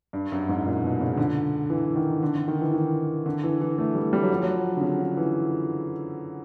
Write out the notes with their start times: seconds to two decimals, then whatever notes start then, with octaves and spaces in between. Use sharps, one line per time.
0.13 G2
0.32 F#2
0.49 G#2
0.65 A#2
0.83 B2
1.00 C#3
1.17 D3
1.70 E3
1.96 D#3
2.23 D3
2.35 D3
2.48 D#3
2.61 E3
2.74 D#3
3.26 D3
3.43 E3
3.61 E3
3.78 A3
3.95 G3
4.13 G3
4.23 F#3
4.33 F3
4.43 F#3
4.77 D3
4.81 C#3
5.00 D3
5.17 E3